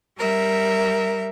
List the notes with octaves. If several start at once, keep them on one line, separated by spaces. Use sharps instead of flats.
G3 A#4 E5